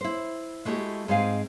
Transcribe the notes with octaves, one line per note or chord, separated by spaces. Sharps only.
E4 C5
G#3 A3 E4 F#4 G4
G#2 G#3 C4 F5 G#5